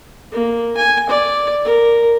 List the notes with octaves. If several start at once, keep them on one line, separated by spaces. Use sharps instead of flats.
A#3
G#5
D5
A#4